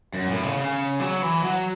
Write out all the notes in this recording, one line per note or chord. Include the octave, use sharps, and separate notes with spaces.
F#2
A2
C#3
C#3
F#3
E3
F#3